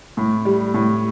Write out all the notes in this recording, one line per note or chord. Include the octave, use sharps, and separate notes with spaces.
A2
G3
A2